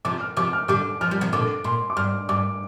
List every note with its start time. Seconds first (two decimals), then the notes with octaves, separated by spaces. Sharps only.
0.05 C3 F3 D6
0.21 F6
0.37 C3 F3 D6
0.53 F6
0.68 D3 G3 D6
1.01 F3 F6
1.11 G3
1.21 C3 F3
1.33 A#2 D3 D6
1.64 A#2 C6
1.90 D6
1.97 G2 F6
2.29 G2 D6